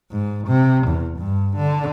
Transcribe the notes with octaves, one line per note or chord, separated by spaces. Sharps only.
G#2
C3
E2
G2
D3